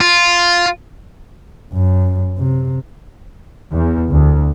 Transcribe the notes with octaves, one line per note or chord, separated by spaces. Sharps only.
F4
F#2
C3
E2
D2